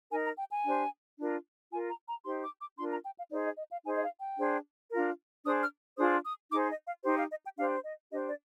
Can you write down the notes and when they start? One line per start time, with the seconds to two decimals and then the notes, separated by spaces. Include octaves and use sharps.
0.11 D#4 A#4 G#5
0.25 A#5
0.38 G5
0.51 G#5
0.65 D4 G4 C5
1.18 D4 F4 A#4
1.71 F4 G#5
1.75 A#4
1.89 A#5
2.07 A#5
2.25 D#4 G4 C5 C6
2.43 D6
2.60 D6
2.78 D4 F4 A#4 C6
2.91 A#5
3.05 G5
3.18 F5
3.31 D#4 G#4 C5 D5
3.45 D#5
3.58 D#5
3.71 F5
3.84 D#4 G#4 C5 G#5
3.95 D#5
4.02 F5
4.20 G5
4.38 D4 G#4 C5
4.91 D4 F4 A#4
5.45 D4 G#4 C5 D#6
5.62 F6
5.98 D4 F4 G#4 C5 D#6
6.25 D#6
6.51 D#4 G#4 C5 D6
6.69 D#5
6.87 F5
7.04 D#4 G4 C5
7.18 F5
7.31 D#5
7.44 G5
7.57 D4 G4 C5 F5
7.84 D#5
8.11 D4 G4 C5 D#5
8.29 D5